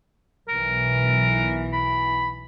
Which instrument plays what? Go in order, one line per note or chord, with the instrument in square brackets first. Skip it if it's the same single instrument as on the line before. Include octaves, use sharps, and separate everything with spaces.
[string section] B1 E3 [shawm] A#4
[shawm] B5